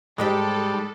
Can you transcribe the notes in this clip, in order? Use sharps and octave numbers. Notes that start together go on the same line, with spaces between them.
G#2 G3 G#3 D#4 G4 A4